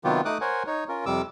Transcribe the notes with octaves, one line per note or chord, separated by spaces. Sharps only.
C3 D#3 F#3 B3 F4 G4
A3 D#4 D6 D#6 F#6
A#4 C5 C#5 F#5 G#5
D#4 C#5
C#4 F4 A#4
F2 C3 G3 D6 E6